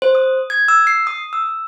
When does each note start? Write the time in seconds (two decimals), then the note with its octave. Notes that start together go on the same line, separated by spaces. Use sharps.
0.02 C5
0.15 D#6
0.50 G#6
0.68 E6
0.87 C7
1.07 D#6
1.33 E6